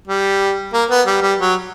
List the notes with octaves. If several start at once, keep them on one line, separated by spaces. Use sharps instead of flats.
G3
A#3
B3
G3
G3
F#3